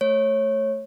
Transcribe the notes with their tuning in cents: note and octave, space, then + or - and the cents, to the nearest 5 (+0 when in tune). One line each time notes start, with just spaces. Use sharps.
A3 +0 C#5 -20